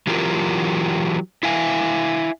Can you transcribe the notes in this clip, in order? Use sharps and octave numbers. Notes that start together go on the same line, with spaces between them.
E3 F#3 F4 G4 A#4
E4 E5 F5 G#5